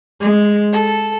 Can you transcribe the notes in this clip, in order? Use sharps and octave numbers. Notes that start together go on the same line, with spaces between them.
G#3
A4